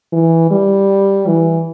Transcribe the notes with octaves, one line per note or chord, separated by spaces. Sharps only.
E3
G3
E3